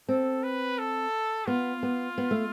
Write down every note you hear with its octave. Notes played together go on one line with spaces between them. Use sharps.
C4 A4
B4
A4
B3 F4
B3
B3
A3